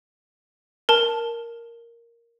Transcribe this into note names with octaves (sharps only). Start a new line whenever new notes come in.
A#4 A5